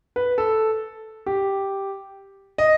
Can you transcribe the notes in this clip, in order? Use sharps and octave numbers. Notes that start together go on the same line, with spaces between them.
B4
A4
G4
D#5